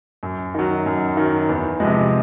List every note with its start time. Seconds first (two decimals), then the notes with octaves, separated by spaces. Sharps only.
0.23 F#2
0.55 D#3 F#3
0.86 F#2
1.17 D#3 F#3
1.49 E2
1.80 C3 F3 G#3